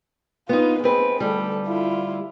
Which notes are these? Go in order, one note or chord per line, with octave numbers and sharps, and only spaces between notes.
B3 D#4 F4 B4
G#3 C4 B4
D2 G3 A4
E4 F4